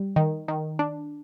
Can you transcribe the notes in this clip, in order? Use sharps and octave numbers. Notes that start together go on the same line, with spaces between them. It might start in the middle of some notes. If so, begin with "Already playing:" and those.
Already playing: G3
D#3
D#3
D4